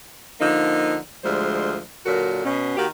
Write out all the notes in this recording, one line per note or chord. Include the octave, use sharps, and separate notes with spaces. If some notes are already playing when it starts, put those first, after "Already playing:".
D3 F3 A#3 D#4
D2 F3 G3 G#3 C5
A#2 D3 F#3 F#4 A#4
B2 C#4
D#3 A#3 F#4 G4